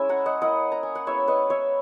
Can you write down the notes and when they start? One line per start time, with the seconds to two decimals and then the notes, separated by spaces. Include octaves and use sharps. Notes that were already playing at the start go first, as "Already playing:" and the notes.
Already playing: G#3 C#4 E4 E5 G#5
0.09 F#5 A#5
0.26 D#5 F#5
0.42 A#3 E4 D#5 F#5
0.72 A#5
0.83 G#5
0.95 F#5
1.06 G#3 B3 E4 C#5 E5
1.28 B4 D#5
1.50 C#5 E5